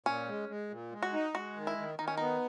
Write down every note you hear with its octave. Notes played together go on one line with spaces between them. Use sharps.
A#2 C#4
G#3
G#3
A#2
G#3
F#4
D#4
G#3 F#4
D#3
E4
D#3
D#3 D#4
C#4
B3 D#4